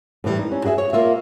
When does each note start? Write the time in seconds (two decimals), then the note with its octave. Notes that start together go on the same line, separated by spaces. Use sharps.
0.24 A2 E3 G3
0.39 D#4
0.52 C#4
0.64 F#4 G#4 D#5 E5
0.78 C#5
0.93 A#3 F4 E5